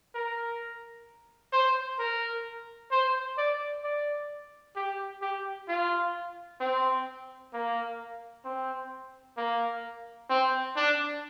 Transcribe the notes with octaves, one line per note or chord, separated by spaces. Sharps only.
A#4
C5
A#4
C5
D5
D5
G4
G4
F4
C4
A#3
C4
A#3
C4
D4